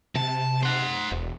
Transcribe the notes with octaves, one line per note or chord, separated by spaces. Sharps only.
C3 A5
C5 F#5
E1